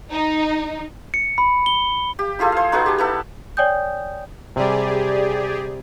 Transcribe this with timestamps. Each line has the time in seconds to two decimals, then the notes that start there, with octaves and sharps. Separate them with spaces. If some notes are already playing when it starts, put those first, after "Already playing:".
0.11 D#4
1.14 C#7
1.38 B5
1.66 G7
2.19 G4
2.39 E4 F4 G#4 A4
2.52 C5 F5
2.72 D#4 F#4 G#4 B4
2.86 G4 A5
2.98 B3 E4 A4
3.57 C#5 D5 G5 G#5 D#6 G6
4.56 C3 G3 G4 G#4 D5